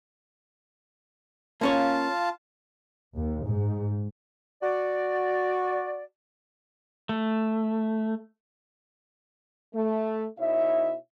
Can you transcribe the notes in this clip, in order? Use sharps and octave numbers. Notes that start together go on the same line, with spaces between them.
A#3 C#4 F4 C#5 F5 A5
D#2
G#2
F#4 D5
A3
A3
B2 D#4 E4 C#5 E5